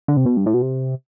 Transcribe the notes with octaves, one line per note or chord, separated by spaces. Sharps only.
D3
C3
B2
G2
A2
B2
C3